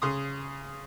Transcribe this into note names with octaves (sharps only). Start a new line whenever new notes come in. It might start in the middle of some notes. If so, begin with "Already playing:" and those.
C#3 C6 D#6